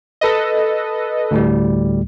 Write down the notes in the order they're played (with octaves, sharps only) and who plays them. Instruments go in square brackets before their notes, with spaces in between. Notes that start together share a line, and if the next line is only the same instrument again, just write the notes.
[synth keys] A4 B4 D#5
[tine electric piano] D2 A2 G3